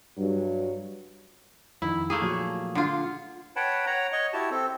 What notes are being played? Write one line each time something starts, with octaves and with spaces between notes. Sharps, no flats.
G2 F#3
F2 D#3 E4
A3 A#3 G#4
A#2 F3 F#3
D3 F4
B4 C#5 F#5 G5 A5 B5
C#5 F#5 A#5
C#5 D#5 C#6
E4 F#4 G4 A5
C4 A4